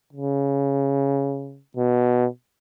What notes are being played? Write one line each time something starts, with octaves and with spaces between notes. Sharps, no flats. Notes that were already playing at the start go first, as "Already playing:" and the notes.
C#3
B2